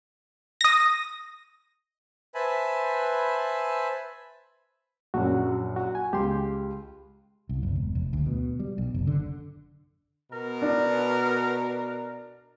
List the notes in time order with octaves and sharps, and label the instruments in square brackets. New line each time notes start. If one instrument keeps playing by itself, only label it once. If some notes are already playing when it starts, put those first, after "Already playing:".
[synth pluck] D#6 A#6
[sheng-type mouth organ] B4 C5 E5 G#5 A5 B5
[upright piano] A#1 F#2 [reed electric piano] F#4
[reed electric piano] F#4
G#5
[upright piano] C#2 [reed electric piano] G4 C6
[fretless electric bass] C2
F#1
E1
F1
D2
B2
G3
B1
F#1
D3
[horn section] B2 A#4
[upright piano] D4